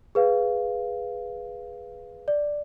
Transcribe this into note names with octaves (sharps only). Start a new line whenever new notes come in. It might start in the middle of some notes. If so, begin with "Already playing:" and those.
G#4 B4 F5
D5